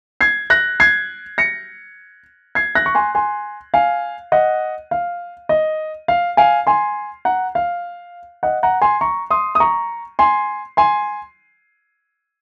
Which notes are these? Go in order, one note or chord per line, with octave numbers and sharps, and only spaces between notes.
G#6 C7
F#6 A#6
G#6 C7
A#6 C#7
G#6 C7
F#6 A#6
C#6
G#5 C6
G#5 C6
F5 G#5
D#5 F#5
F5
D#5
F5
F5 G#5
G#5 C6
F#5 A#5
F5
D#5 F#5
F#5 A#5
G#5 C6
A#5 C#6
C6 D#6
D#6
A#5 C#6
G#5 C6
G#5 C6